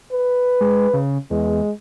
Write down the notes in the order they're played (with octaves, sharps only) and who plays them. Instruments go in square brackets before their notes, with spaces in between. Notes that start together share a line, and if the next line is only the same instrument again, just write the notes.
[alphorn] B4
[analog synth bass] G#3
C#3
[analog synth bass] E2 [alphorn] G#3